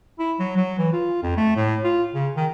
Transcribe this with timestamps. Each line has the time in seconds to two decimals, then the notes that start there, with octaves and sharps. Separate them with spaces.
0.19 E4
0.40 F#3
0.56 F#3
0.78 E3
0.93 F4
1.23 F2
1.37 A3
1.56 A2
1.84 F4
2.14 C#3
2.36 D#3